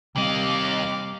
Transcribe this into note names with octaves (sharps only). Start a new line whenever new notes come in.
D#2 C3 G3 C4 D#5 F5 D6